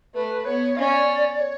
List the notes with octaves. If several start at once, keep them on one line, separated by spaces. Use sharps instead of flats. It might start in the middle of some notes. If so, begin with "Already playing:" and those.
A3 B4
B3 C#5
C#4 D5 F5
C#5